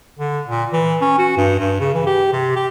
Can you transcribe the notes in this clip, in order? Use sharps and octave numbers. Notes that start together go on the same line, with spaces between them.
D3
A#2
E3
C#4
F#4
G2
G2
C#3
E3
G4
C3
G4